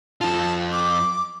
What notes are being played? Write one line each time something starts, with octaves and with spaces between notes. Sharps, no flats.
F2 F4 A5
D6